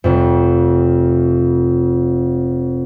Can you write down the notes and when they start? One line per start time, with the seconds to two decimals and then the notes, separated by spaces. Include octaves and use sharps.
0.04 F1 F2